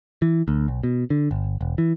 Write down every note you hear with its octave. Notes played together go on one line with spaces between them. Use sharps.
E3
D2
B1
B2
D3
G1
E1
E3